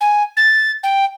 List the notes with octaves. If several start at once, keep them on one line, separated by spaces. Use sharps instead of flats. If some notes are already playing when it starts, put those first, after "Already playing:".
G#5
A6
G5